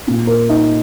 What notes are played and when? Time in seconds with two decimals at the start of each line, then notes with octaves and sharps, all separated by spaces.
0.07 A#2
0.27 A#4
0.49 D#4